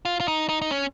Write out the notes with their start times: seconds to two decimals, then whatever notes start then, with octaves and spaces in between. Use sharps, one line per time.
0.05 F4
0.20 F4
0.28 D#4
0.49 D#4
0.62 D#4
0.71 C#4